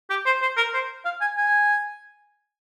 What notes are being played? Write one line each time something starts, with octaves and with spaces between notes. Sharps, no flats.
G4
C5
C5
A#4
C5
F5
G#5
G#5